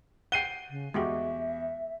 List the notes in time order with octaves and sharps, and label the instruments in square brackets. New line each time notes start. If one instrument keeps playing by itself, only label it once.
[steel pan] F#5 G5 [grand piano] C7 D#7 G7
[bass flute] C#3
[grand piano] E2 [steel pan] G#3 F#4 G4 [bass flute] E5